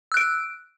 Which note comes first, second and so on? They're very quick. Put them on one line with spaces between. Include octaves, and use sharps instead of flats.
E6 F#6 D7